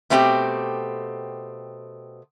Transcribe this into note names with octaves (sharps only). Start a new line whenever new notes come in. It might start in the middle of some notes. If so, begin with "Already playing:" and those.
B2 A3 C4 E4 G4